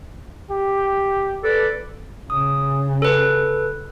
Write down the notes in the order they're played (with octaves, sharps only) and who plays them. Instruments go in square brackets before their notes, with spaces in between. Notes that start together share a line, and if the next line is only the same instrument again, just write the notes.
[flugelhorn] G4
[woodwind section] A4 B4 D5
[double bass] C#3 [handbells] D#6
[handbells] A4 B4